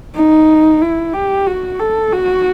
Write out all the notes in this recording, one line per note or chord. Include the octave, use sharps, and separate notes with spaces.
D#4
E4
G4
F#4
A4
F#4